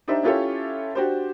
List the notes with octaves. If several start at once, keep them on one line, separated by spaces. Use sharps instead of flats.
D4 D#4 G4 C5 E5
C#4 E4 F4 G4 A4 C#5
D4 F#4 G4 C5